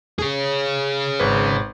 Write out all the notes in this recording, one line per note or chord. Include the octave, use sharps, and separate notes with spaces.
G#4 C#5
G#1 B4